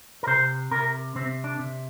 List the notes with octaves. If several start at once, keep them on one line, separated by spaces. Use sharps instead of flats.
A#4
C3 C5
C3 A#4
C3 C4
D4
C3